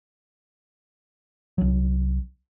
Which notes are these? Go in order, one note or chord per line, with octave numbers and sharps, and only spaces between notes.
C2 F#3